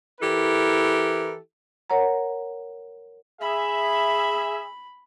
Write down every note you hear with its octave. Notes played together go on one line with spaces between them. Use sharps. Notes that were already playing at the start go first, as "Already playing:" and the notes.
E3 E4 G4 A4 A#4
A#4 C#5 F#5 A#5
G#4 E5 B5